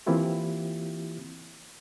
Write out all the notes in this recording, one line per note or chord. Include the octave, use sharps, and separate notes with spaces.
E3 A#3 C4 E4 F4 G4